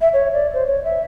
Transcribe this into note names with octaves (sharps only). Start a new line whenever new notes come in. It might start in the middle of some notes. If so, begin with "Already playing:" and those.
E5
C#5
D5
C5
C#5
E5